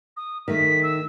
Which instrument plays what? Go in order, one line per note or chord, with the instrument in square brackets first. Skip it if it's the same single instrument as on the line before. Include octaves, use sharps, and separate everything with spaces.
[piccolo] D#6
[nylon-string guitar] D#3 A3 [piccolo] B6
[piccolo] E6